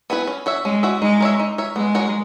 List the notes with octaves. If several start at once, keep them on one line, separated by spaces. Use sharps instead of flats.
B3 E4 G#4 B4
C#4
F#4 C#5 E5
G#3 C#4
F#4 C#5 E5
G#3 D#4
A#4 C#5 E5
D#4
A#4 C#5 E5
G#3 B3
F#4 A#4 C#5